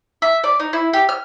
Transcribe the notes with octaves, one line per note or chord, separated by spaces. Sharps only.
E5
D5
D#4
E4
G4
F6